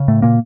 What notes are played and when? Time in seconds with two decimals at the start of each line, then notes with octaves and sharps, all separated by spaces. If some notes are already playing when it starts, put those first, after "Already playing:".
Already playing: C#3
0.08 A2 A3
0.22 A#2 A#3